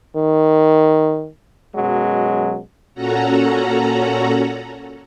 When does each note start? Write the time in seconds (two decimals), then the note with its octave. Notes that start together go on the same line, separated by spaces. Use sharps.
0.16 D#3
1.74 F#2 B2 F#3 G#3
2.95 A#2 C#4 F#4 A4 F#5 A#5